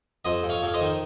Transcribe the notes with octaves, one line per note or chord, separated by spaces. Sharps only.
F2 C5 D#5
F2
C#5 F5
F2 F5
C5 D#5
D#3